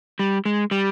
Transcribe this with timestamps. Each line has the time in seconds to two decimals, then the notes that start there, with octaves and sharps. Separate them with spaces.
0.19 G3
0.45 G#3
0.71 G3